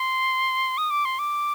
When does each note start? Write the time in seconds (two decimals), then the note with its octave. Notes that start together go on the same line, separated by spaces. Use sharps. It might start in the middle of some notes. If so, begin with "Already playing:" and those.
Already playing: C6
0.78 D#6
0.90 D6
1.05 C6
1.19 D6